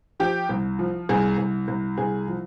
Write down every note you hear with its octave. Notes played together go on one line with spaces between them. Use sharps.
F3 G4
C2
F3
C2 G#4
C2
C2
C2 G#4
F3